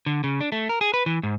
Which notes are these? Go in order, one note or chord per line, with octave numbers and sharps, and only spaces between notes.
D3
C#3
D4
A3
A#4
G#4
B4
E3
G#2